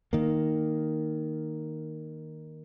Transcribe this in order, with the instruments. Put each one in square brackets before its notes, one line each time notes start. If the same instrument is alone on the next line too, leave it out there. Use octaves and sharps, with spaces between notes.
[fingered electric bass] D#3 A#3